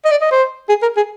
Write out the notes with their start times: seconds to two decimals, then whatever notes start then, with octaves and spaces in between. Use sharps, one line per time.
0.05 D#5
0.11 D5
0.21 D#5
0.31 C5
0.69 G#4
0.82 A#4
0.96 G#4